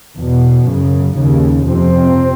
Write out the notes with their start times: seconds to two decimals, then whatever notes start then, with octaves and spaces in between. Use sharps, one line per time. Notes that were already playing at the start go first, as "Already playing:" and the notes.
0.16 E2 B2
0.66 F#2 C#3
1.17 D#2 C#3
1.67 F2 C3 C4